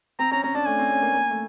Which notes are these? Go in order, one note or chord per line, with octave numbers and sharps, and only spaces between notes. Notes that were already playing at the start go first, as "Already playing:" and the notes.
C4 A#5
C#4 A#5
C#4 A#5
D4 A5
A3 G#5
C4
C#4
A#3
A#3
A3